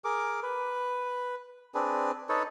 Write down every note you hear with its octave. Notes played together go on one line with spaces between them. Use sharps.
G#4 A#4 D6
B4
C4 D4 G#4 B4
D#4 A4 B4 C#5